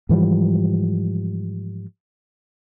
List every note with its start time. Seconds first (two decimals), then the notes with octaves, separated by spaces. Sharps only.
0.09 G#2 E3 F3 G3